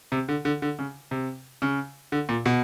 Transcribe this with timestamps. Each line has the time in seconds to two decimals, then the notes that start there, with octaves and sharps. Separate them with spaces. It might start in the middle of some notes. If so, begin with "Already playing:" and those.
0.12 C3
0.29 D3
0.45 D3
0.62 D3
0.79 C#3
1.11 C3
1.62 C#3
2.12 D3
2.29 A#2
2.46 B2